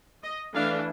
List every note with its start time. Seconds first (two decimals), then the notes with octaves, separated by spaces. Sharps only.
0.23 D#5
0.54 E3 A3 D4 F5